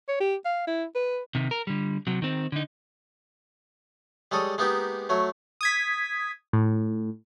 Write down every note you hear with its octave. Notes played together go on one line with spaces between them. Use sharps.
C#5
G4
F5
E4
B4
C3 D#3
A#4
D3 G3
C3 F#3
D#3 C4
D3 D#4
G3 G#3 A4 C#5 D#6
G#3 A#3 B3 D#4 G4
F#3 A3 C#5
D#6 G#6 B6
A2